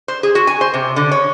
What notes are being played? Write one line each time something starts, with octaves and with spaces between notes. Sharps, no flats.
C5
G#4
F#4
G#5
C5
C3
D3
C#5